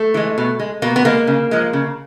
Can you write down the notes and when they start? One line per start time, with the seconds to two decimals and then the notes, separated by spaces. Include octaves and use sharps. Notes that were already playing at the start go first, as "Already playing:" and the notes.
Already playing: A3
0.14 E3 G#3
0.38 B2
0.60 G#3
0.82 B2 A#3
0.96 B3
1.05 G#3 A#3
1.27 C#3
1.51 F3 G#3
1.73 C#3